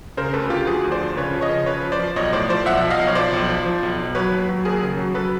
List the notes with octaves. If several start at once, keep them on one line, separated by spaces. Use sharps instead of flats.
C#3 A#4 C5
D2 A4 B4
D2 F4 G4
F3 F#4 G#4
D2
C5 D5
F3
C#3 B4 C#5
F3
C#5 D#5
C#3
F3 B4 C#5
F3
C5 D5
F3
B1 C#5 D#5
A2 C5 D5
F3 C5 D5
B1 E5 F#5
F3
D#5 F5
B1
C#5
F3 C5 D5
B1
F3
F3
B1
B1
F#3 B4 C#5
D#2
F#3
D#2 G#4 A#4
C#3
F#3
F#3 A4 B4